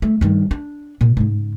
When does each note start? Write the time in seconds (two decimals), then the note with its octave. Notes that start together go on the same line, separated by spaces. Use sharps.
0.02 A3
0.21 G2 D#3
0.51 D4
1.01 A#2
1.17 G#2 C#3